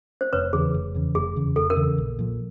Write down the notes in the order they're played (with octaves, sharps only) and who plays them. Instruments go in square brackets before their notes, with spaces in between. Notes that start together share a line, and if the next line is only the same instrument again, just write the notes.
[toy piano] C5
[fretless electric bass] F1 [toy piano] B4 C#5
[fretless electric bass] E2 C#3 [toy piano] G#4
[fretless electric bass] F1
E2 C#3
[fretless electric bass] F1 [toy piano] G#4
[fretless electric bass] E2 C#3
[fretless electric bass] F1 [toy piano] A4
[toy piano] A#4
[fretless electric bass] E2 C#3
A#1
A#2 F3